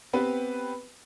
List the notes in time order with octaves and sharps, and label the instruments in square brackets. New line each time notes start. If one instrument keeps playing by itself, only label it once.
[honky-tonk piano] B3 C4 G4 B4